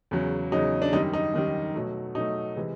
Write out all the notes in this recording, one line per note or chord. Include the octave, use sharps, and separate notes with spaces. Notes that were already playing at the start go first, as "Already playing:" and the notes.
E2 C#3 F#3
E2 C#3 F#3 D#4
D4
F#2 D#3 G3 D#4
D#4
F#2 D#3 G3
B2 F#3 A3
B2 F#3 A3 D#4
C3 E3 G#3